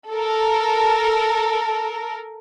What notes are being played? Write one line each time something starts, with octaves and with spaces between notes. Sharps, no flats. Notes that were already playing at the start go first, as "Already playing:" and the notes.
A4 A#4